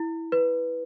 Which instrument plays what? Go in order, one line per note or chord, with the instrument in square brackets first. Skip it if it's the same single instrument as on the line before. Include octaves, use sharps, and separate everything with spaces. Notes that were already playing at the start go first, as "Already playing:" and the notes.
Already playing: [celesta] E4
B4